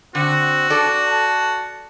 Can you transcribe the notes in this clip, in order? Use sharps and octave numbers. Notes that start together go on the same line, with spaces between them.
D3 C4 F#4
D4 A4 D5
A5